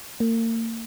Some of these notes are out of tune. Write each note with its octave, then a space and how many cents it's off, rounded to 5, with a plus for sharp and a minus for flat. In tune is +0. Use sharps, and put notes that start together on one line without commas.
A#3 -40